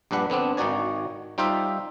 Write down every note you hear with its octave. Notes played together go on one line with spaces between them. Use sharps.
A#1 G2 D4 B4 F#5
D3 B3 C4 D4
G#1 D#3 D#4 F#4 D5 G#5
G3 D#4 F4 G4 C5 E5